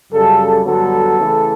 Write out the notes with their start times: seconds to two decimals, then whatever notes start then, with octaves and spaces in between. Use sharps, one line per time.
0.13 F#2 C#3 G3 A4
0.65 G2 D3 F#3 B3 A4
1.18 E2 C#3 E3 A3